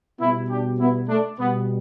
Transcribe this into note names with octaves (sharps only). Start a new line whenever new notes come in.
B2 G3 B3 E4
D4 G4
B3 E4
A3 D4
B2 G3 B3